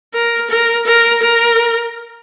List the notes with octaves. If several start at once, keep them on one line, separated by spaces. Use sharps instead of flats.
A#4
A#4
A#4
A#4